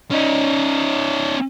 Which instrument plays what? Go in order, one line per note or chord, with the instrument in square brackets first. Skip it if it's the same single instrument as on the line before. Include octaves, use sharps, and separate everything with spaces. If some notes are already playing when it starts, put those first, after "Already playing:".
[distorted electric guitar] C#4 D#4